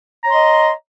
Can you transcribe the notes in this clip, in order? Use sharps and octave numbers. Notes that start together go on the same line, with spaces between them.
C#5 D#5 A#5 C6